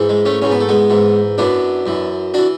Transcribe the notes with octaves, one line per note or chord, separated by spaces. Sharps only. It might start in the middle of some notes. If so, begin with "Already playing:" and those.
Already playing: G#2 E3
G#3
A3 C#4
G#2 E3 C#4
B3
A3
G#3 B3
G#2 E3
F#2 E3 B3 D4
F#2 E3
E3 D4 F#4